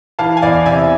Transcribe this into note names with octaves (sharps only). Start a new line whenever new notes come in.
E3 F5 A5
G#5
E2 D5 F5
C3 E5 G#5